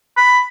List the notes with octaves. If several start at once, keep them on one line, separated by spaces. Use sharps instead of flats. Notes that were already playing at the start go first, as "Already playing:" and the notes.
B5